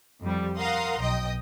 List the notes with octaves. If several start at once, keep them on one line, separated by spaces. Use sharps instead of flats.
F2 G3
A#4 F5 F#5 A#5 C6 D#6
B1 D#5 G5 D#6